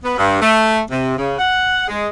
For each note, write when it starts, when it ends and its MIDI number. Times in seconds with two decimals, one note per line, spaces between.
0.04 0.15 59
0.18 0.37 43
0.41 0.81 57
0.91 1.14 48
1.18 1.38 49
1.38 1.88 78
1.88 2.08 56